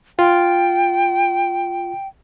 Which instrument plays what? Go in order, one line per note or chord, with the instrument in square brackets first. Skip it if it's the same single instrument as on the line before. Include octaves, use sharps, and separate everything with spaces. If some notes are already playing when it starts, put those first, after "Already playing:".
[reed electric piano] F4 [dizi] G5